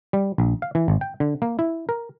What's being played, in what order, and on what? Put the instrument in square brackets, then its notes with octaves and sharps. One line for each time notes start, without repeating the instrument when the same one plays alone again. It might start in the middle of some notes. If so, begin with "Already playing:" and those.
[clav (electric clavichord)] G3
A#1
F5
E3
G#1
G5
D3
A#3
E4
A#4